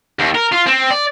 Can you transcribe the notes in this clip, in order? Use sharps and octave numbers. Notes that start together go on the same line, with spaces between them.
D#2
A#4
F4
C4
D5